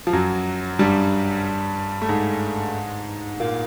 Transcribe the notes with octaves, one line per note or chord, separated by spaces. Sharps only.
F3
F#2 F#3
G2 G3
A3
G#2 G#3
A#2 A#3